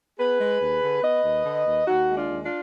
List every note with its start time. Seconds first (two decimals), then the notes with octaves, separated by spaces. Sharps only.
0.18 B3 G#4 B4
0.39 G#3
0.60 D#2
0.82 D3
1.03 B3 B4 D#5
1.24 D#2
1.45 D3
1.66 D#2
1.87 D#2 D#4 F#4
2.09 G#3
2.15 D4 F4
2.29 D#2
2.43 D4 F4